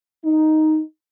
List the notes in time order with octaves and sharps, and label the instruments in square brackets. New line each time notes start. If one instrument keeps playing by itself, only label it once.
[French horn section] D#4